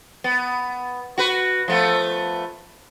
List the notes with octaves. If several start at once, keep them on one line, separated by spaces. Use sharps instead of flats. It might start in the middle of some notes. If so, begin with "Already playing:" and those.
B3
F#4 B4
F3 A3 B3